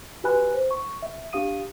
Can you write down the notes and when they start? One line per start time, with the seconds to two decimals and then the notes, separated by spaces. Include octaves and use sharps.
0.24 F#4 G4 B4 G#5 B5 F#6
0.54 C5
0.71 C#6
1.03 E5
1.33 D4 G4 F5 D#6 D#7